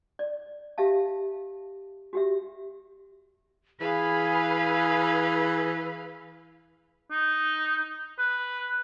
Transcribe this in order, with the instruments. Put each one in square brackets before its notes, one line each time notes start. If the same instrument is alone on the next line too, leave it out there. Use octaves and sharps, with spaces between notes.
[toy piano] D5
G4 E5 F5 A5
F#4 G4 E5
[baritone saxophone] E3 [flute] G#4 [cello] B4 [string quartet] F5 B5
[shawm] D#4
B4